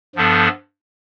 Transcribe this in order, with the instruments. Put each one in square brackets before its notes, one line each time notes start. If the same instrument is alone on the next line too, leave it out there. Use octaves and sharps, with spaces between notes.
[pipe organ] G2 F3 B3 D4 A4